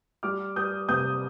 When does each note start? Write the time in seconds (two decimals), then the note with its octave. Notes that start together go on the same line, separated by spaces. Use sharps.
0.23 G3 D6 F6
0.56 G3 D#6 G6
0.89 C3 D#6 G6